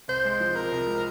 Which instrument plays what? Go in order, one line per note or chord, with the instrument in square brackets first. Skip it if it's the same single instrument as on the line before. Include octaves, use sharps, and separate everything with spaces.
[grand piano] C2 [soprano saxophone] C5
[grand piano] G#3
F3
[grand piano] C3 [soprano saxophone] A#4
[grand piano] C2
G#3